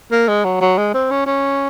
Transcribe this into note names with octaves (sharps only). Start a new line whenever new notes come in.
A#3
G#3
F#3
F#3
G#3
C4
C#4
C#4